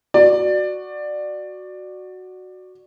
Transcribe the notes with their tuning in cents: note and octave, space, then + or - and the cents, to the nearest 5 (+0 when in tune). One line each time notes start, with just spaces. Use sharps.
F#4 +0 D5 +15